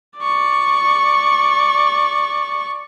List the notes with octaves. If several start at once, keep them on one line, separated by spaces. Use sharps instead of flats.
D5 C#6